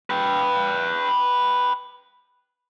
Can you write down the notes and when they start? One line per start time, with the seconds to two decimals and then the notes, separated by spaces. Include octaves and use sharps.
0.10 B4 G5